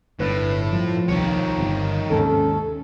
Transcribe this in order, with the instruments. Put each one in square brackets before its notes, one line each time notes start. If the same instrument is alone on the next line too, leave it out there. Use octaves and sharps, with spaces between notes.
[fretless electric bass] G1 D4 [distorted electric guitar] A2 [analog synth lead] B4
[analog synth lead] F3
[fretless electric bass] D#1 C2 [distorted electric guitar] D#3 C#5
[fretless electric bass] G1 C3
[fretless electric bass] D#2 G#2 C3 [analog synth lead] C#4 [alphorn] A4